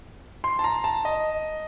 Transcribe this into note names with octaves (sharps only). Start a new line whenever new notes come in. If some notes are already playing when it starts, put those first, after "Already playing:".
C6
A5
A#5
A5
D#5